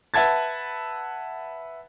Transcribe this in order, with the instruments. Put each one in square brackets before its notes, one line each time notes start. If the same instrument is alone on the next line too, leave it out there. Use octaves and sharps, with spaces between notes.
[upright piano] B4 E5 F#5 A5 G#6 A6